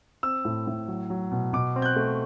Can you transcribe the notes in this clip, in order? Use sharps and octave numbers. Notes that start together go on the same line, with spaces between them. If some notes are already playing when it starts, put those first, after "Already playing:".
C4 E6
A2
A2
F#3
F#3
B2
B2 D6
C4
G6
F#6
A3